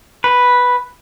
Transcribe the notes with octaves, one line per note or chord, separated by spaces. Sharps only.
B4